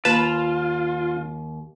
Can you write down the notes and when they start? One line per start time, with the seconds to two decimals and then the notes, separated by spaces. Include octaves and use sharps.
0.05 D#2 F4 B4 A5